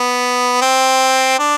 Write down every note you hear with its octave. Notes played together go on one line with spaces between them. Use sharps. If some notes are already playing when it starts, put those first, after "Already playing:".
Already playing: B3
C4
D4